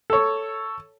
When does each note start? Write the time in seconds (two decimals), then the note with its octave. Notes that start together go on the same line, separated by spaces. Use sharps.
0.10 A4 C#5